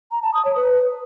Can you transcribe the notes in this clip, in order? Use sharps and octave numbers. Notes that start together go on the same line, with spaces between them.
A#5
A5
D#6
C#5
B4